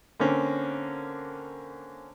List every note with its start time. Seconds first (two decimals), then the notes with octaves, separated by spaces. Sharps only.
0.20 D3 A#3 C4 C#4